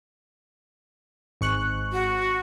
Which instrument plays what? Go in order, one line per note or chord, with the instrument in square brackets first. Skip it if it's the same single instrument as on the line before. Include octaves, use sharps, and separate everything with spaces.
[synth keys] G#1 C#6 F#6
[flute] F#4